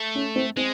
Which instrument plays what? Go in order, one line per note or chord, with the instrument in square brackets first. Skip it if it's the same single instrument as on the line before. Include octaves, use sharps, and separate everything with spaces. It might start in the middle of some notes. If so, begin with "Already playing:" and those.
Already playing: [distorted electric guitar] A3
[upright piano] C#4
C4
[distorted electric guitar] G#3 [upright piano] C4